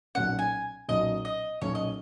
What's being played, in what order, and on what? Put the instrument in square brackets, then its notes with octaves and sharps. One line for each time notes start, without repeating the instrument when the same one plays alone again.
[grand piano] B1 A#2 F#3 C#4 [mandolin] F#5
[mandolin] G#5
[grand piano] B1 A#2 F#3 C#4 [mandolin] D#5
[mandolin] D#5
[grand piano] B1 A#2 F#3 C#4 [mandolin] C#5
[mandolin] D#5